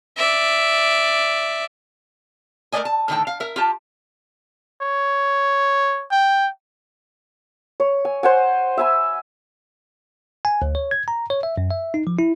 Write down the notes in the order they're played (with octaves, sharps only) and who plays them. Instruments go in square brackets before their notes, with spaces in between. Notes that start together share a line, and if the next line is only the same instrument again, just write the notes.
[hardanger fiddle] D5 E5
[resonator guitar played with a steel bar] A3 A#4 B4 D5 D#5 G#5
A5
A2 D3 D#3 D#4 G5 A5
F5
A#4 E5
F4 G4 A5
[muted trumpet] C#5
G5
[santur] C#5
G#5
C5 F#5 G#5
E5 G#5 B5
[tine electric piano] G#5
D2
C#5
G#6
A#5
C#5
E5
F#2
E5
D#4
F3
E4